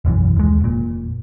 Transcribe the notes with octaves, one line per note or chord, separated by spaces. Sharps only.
E1 B1 F#2 E3
D#2 G#3
F1 A#2